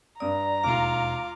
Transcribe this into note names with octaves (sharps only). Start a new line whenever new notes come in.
G2 D5 A#5 D#6
E1 D#2 F4 F5 D6 F6